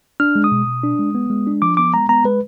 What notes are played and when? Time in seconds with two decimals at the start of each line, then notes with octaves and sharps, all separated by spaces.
0.20 D4 F6
0.36 G#3
0.44 D#6
0.52 B2
0.67 B2
0.83 D4
0.99 G#3
1.15 B3
1.30 G#3
1.47 D4
1.62 F3 D6
1.77 B3 D6
1.93 G#3 A#5
2.09 B3 A#5
2.24 G#3 B4